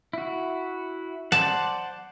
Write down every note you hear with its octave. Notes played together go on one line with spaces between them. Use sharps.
E4 F#4
C5 D5 F#5 A5